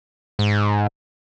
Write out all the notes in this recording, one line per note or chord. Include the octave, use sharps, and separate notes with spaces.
G#2